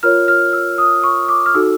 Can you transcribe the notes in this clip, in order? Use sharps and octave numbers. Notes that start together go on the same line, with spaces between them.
F4 A#4 C#5 F6
F6
E6
D#6
C#6
D6
F6
D#4 F#4 A4 E6